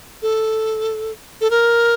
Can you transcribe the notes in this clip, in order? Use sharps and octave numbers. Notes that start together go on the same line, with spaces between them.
A4
A4
A#4